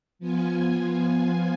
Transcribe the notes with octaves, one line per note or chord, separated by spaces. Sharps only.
F3 B3 F4 G#5